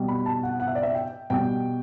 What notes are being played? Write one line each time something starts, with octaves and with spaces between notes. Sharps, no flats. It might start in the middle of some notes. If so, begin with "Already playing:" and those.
Already playing: B2 G3
B5
A5
F#5
F#5
E5
D5
E5
G5
B2 G3 G5